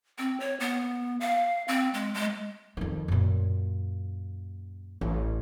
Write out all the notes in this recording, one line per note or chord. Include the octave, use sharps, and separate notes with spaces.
C4
C#5
B3
F5
C4
G#3
G#3
F2 D#3
F#2 A#2
A1